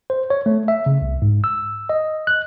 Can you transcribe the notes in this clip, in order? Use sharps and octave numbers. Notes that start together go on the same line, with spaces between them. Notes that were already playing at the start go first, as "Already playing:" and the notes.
C5
C#5
A3
E5
C#3
C2
G#2
E6
D#5
F#6